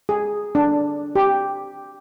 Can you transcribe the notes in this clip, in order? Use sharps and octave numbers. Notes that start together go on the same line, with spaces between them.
G#4
D4
G4